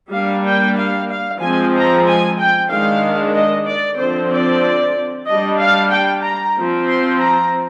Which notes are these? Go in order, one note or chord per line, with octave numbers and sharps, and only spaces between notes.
G3 A#3 D4 F5
G5
F5
F5
F3 G#3 C4 G#5
A#5
G#5
G5
D#3 G#3 D4 F5
D#5
D5
D3 F3 C4 C5
D5
G3 D4 D#5
F5
G5
A#5
F3 C4
C6
A#5